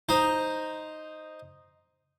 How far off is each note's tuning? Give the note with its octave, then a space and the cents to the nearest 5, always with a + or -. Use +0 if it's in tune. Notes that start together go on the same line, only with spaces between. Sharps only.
D#4 +0 C5 +0 A#5 +0